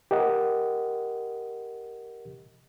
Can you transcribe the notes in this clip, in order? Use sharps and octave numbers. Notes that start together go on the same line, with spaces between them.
G4 A#4 D#5 F#5